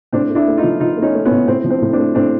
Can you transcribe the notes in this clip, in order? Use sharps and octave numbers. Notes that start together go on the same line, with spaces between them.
A2 C4 D4
A3
D4 E4
A3
D#4 F4
F3
F3 D#4 F4
A3
C#4 D#4
A3
B3 C#4
A2
A2 C4
F3
C4
A2
C4 D4
A3
A2 C4 D4